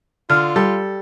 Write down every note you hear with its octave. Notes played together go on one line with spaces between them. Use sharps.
D3 F4 F6
G3 A4